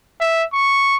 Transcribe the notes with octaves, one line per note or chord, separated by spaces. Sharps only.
E5
C#6